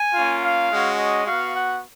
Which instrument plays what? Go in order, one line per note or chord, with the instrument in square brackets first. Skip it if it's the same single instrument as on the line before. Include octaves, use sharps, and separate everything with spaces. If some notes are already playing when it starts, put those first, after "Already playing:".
Already playing: [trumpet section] G#5
A#3 C#4 F4
F5
G#3 C#4 F#4
D#5
B3 F#4 F5
F#5